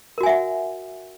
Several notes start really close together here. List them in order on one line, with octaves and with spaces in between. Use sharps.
A#4 F#4 G#5 E5 F#5